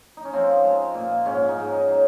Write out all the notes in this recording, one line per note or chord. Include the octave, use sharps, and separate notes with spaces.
D#4
C#4
F3 C4
G#3
A#2
G#2 C#4
D#4
G#2
D#4
F#3